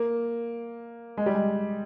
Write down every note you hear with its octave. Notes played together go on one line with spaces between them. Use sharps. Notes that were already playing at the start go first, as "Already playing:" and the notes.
Already playing: A#3
G#3
G3
G#3